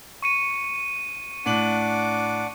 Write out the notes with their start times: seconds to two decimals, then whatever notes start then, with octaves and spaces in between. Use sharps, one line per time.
0.22 C#6 C#7 D#7
1.46 A2 D4 F#5 D6 F#7